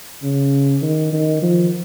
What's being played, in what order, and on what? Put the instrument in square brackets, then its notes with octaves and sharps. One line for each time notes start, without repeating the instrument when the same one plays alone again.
[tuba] C#3
D#3
D#3
F3